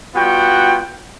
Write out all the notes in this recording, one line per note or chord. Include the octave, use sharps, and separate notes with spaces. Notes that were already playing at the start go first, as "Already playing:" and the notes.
G3 B3 F4 F#4 F#5 G5